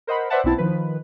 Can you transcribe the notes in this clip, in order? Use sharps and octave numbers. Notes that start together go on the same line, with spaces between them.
A#4 C5 D#5 F#5 B5
B4 C5 D5 E5 F#5 A5
B1 B3 C4 E4 A5
D#3 F3 B4